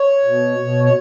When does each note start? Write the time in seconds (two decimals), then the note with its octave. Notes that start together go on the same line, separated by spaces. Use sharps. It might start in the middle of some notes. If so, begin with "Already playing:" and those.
Already playing: C#5
0.25 B2
0.59 B2
0.84 C#5